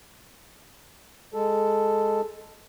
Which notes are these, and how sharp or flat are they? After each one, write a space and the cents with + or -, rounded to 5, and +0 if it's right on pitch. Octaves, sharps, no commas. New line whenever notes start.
G#3 +0 A4 +0